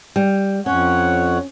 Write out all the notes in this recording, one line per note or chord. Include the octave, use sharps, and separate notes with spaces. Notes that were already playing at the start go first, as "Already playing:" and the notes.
G3
F2 C#4 C#5 F#5